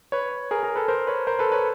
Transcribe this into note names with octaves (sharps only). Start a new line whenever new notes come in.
B4 C#5
G#4 A#4
G#4 A#4
A4 B4
A#4 C5
B4 C#5
A#4 C5
A4 B4
B4 C#5